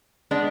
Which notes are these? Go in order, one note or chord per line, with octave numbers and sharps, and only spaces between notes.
G#3 B3 D4